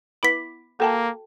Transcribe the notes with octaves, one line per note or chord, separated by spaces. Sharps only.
B3 E4 B5 D6 B6
A#3 F#4 A4 G5 A5